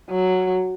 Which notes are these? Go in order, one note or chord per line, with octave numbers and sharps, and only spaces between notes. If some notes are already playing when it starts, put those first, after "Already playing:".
F#3